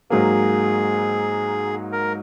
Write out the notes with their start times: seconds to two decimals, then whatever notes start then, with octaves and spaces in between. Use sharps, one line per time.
0.10 G#2 F#3 A#3 G#4
1.92 A#4